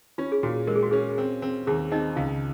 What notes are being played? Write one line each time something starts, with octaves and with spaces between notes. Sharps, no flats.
C#4 F4
G#4
A#2 F#4
G#3 A#4
G#4
F#4
C#4 G#4
C4
C4
D#2 G#4
C4 D#4 D#5
C#2 F4 F5